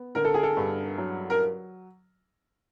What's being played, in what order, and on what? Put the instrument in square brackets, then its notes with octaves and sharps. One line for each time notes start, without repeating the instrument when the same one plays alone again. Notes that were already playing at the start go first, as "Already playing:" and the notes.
Already playing: [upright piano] B3
D3 A#4
A4
G#4
A4
G2
F#3
A#4